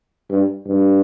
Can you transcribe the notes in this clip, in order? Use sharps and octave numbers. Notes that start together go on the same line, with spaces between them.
G2
G2